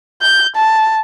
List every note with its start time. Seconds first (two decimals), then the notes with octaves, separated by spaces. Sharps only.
0.22 G6
0.56 A5